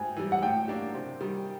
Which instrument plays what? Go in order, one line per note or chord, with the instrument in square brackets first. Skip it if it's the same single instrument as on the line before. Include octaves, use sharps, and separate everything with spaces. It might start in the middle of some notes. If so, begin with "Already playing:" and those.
Already playing: [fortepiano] G#2 [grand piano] G5 G#5
[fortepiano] E3 G3
[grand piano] F#5
[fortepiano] A2 [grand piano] G5
[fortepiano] F#3 A#3 D4 G4
C3
D#3 G3